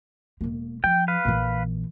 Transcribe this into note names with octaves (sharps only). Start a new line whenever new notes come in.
E1 A#3
F3 G5
B4 F5
A#1 E3